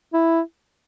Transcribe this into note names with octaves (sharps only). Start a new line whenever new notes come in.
E4